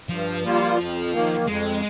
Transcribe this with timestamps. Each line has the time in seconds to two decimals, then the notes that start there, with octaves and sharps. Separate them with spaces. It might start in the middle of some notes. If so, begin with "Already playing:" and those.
0.09 G2 F3
0.43 G3 A#3 F4
0.78 F2
1.12 D#3 A#3
1.47 F2 G#3